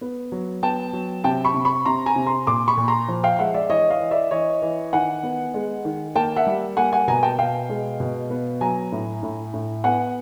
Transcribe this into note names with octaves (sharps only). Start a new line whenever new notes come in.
B3
F#3
B3 G5 A5
F#3
C3 G5 A5
B5 C#6
C3
B5 C#6
C3 A#5 C6
G#5 A#5
C3
A#5 C6
A#2 C6 D6
B5 C#6
A#2
A#5 C6
F3
F5 G5
G#3 E5 F#5
D5 E5
E3 C#5 D#5
D#5 F5
E3
D5 E5
E3 C#5 D#5
E3
D#3 F#5 G#5
B3
G#3
D#3
A#3 G5 A5
E5 F#5
G3
A#3 F#5 G#5
F#5 G#5
B2 G#5 A#5
G5 A5
B2 F5 G5
G#3
B2
B3
F#3 G#5 A#5
A2
A2
A2
B3 F#5 G#5